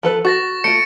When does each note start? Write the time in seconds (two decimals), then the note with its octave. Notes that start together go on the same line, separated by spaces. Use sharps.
0.03 F3 A4 B4
0.25 F#4 C#6 A6 A#6
0.64 A3 F4 C#7 D7